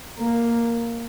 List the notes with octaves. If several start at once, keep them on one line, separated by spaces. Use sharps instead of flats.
A#3